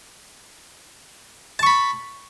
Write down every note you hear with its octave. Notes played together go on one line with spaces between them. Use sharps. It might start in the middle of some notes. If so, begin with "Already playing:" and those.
A5 B5 C#6